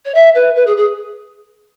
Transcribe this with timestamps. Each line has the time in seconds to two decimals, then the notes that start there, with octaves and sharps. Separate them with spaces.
0.05 C#5
0.14 E5
0.34 B4
0.55 B4
0.66 G#4
0.76 G#4